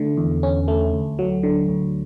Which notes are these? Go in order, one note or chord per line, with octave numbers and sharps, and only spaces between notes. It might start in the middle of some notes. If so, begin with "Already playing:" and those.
Already playing: D3 A3
E2
C#4
A3
D2
F#3
D3
D2